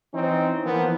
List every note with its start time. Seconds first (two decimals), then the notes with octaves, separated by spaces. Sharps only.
0.14 E3 C4 C#4 D#4
0.66 E3 F3 A#3 B3